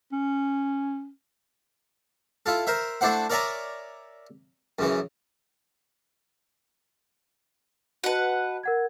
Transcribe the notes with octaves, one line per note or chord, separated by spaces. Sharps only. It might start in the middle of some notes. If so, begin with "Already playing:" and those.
C#4
E4 F4 A4
A#4 C5 E5
A3 D4 E4 C5 F#5
A#4 C#5 D5 E5 G#5 A#5
F#2 C#3 E3
F#4 B4 D#5 F#5 A5
A#4 F#5 G#6